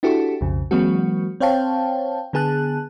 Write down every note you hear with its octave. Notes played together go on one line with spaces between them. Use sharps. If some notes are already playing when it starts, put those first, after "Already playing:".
D4 E4 F#4 G4 A4
B1 F2 C#3
E3 F#3 G#3 A#3 C4 F#4
C4 C5 C#5 F5 G5 A5
D3 B3 G#4 A5 F#6